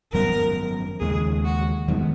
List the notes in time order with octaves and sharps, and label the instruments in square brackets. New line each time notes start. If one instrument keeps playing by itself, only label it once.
[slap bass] G#1 F#2 F3 B3 [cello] A#4
[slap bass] D#2 C#3 G#3 [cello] G#4
[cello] F#4
[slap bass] F2 D#3 G#3 B3